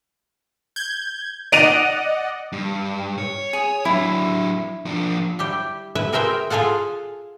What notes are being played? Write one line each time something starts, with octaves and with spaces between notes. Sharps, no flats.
G6 G#6
D5 D#5 F#5 D7 D#7 F7
G2
C#5
G#4
F#3 D4 E4
F3 D4
G3 E4 G4
E4 B4 E5
G#4 A#4 C5 E5 G5
F4 G#4 A4 F5 F#5